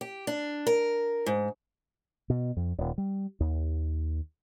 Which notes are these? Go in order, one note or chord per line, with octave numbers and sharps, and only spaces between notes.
G4
D4
A#4
G#2
B2
F2
D#1
G3
D#2